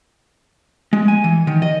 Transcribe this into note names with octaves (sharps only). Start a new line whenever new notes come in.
G#3
G#5
E3
D#3
D#5